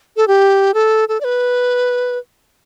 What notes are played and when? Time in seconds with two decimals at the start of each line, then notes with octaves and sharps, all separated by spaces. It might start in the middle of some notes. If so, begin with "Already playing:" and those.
0.17 A4
0.28 G4
0.74 A4
1.09 A4
1.21 D5
1.24 B4